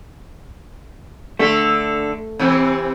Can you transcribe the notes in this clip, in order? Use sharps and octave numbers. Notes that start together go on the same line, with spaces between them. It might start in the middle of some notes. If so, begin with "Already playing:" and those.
D3 A3 A4
C3 E3 C4